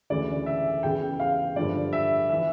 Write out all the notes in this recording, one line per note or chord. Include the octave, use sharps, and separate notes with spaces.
D2 C#3 E3 D5
E5
E2 C#3 E3 G5
F5
G2 D3 F3 D5
E5
E3 E5